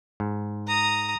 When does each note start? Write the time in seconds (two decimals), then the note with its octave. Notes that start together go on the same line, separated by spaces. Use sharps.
0.20 G#2
0.67 A#5 D#6